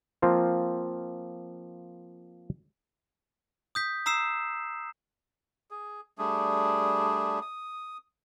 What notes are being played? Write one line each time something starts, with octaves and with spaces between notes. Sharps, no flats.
F3 A#3 C4 F4
D#6 G6 B6
A#5 D#6 E6 C7 E7
G#4
G3 A3 D4 G#4
D#6